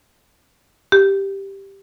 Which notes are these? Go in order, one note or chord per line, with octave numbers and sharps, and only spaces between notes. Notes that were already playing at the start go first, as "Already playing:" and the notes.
G4